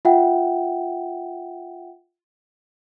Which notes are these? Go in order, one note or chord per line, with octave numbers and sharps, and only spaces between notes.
F4 E5 F#5 G5